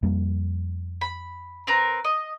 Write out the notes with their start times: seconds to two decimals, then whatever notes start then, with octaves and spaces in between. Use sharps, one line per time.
0.03 F2 G3 A#3
1.01 B5
1.67 C4 A#4 B4
2.04 D#5